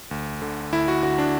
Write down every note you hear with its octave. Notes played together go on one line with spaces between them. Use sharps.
D2
D3
D2 E4
F#4
D3 F#4
D4